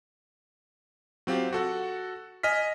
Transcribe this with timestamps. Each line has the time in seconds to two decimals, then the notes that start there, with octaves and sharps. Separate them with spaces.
1.27 F#3 C4 F4 G4
1.53 F#4 A4 F#5
2.43 D#5 G#5 F6 B6